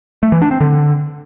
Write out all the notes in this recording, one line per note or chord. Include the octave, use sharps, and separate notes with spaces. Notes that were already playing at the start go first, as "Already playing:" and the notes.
A3
E3
D4
C4
D3